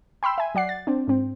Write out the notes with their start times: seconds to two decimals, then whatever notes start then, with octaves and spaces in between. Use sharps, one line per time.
0.23 G5 B5 C6 E6
0.38 E5 G#5
0.55 F#3 D5 F#5 C7
0.69 A6
0.87 C4 D4
1.07 G#2 C4